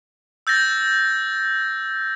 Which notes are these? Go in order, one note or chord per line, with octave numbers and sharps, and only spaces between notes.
E6 G6 A6 A#6